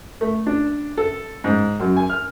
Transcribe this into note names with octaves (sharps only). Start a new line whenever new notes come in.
A3
D4
A4
G#2
F#2
G#5
F6